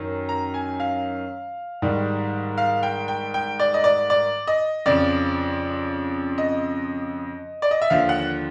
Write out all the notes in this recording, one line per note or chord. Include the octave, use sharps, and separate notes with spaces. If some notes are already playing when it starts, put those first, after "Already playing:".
Already playing: F#2 D#3
A#5
G#5
F5
G#2 D#3 G3
F5
G5
G5
G5
D5
D#5
D5
D5
D#5
F2 C#3 F3 D5
D#5
D5
D#5
E5
D#2 D3 F3 F5
F#5